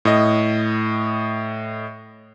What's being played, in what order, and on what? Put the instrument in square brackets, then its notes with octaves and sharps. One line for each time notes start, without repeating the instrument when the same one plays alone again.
[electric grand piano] A2 D#5